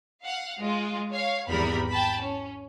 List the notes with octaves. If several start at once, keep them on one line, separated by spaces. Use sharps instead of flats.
F5 F#5
G#3 F4 G#4
C#5 F5
G#1 E2 G3 A#4 B5
G5 A5 B5
C#4